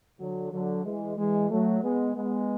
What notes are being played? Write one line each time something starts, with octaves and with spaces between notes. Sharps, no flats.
D3 F#3
D3 F#3
E3 G#3
E3 G#3
F#3 A3
G#3 B3
G#3 B3